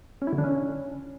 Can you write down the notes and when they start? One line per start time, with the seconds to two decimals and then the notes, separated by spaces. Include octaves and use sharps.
0.22 C#4
0.27 E4
0.33 D3
0.38 D4
0.44 C#4